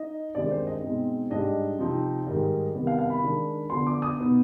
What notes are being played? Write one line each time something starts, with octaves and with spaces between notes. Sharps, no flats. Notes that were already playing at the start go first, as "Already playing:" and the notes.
Already playing: D#4 D#5
G2 D#3 G#3 C4 D5
C5
D#5
B2 G#3 C4 D#4
G#2 G3 D4 D#5
C3 F3 C4 D#4
G#2 D#3 G3
C3 D#3 G3 B3
F5
F5
B5
D#3 G#3 D4
D3 F3 B3 C6
D6
D#6
B2 B3 D#4